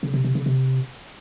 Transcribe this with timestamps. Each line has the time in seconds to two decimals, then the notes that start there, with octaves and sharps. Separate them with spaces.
0.03 C#3
0.14 C3
0.24 C3
0.35 C#3
0.46 C3